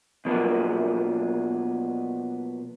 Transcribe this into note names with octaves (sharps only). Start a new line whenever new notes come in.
B2 F3 F#3 A#3 B3 D4